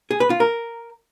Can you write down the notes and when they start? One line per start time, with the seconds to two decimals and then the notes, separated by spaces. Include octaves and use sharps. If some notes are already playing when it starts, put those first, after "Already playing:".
0.11 G#4
0.20 B4
0.30 F4
0.40 A#4